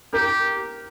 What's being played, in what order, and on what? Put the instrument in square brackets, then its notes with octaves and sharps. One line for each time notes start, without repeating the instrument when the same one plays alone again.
[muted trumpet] G4 [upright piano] A#4